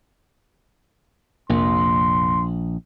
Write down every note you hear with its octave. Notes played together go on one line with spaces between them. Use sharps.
A#1 F2 C3 A#3 C6